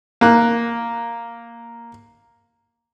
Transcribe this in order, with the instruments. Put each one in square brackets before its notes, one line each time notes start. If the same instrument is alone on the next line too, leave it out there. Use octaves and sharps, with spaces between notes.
[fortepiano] A#3 F#6